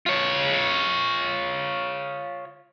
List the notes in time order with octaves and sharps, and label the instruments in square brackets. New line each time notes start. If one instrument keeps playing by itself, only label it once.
[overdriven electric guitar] F4 C#5